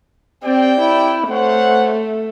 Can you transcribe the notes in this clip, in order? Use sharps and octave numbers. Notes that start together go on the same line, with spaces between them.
C4 G4 D5 G5
E4
A3 C5 C#5 F#5